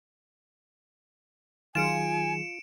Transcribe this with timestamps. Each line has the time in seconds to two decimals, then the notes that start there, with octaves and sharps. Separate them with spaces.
1.75 D#3 F#3 F4 G#4 G#5 C#7 D7 E7